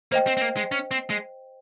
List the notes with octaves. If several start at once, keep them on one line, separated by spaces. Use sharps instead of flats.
A#3 C5 D#5 G5
C4
C4
A#3
G#3
C#4
C4
G#3